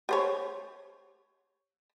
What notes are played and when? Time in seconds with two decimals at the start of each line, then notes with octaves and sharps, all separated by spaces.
0.09 G4 C5 C#5